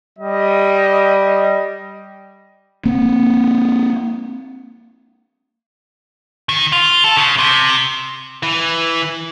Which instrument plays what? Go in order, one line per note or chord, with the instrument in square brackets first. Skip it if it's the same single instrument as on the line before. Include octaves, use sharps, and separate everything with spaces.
[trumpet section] G3 D#5
[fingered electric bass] A#3 C4
[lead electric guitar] D#3
F4
A4
C#3
C3
[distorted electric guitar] E3